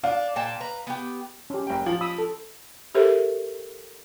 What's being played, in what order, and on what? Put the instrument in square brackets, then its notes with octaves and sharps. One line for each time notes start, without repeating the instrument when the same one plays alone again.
[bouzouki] D4 [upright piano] F5
[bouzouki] A#2 G5 A5
B4 A#5
B3 G4
[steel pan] C#4 G4
[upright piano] F#1 G5
F3
[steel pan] B5 D#6 E6
A4
[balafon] G4 A4 A#4 C5 E5